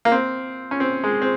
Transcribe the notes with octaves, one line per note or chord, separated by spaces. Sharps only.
A#3
C4
C#4
C4
G#3
C4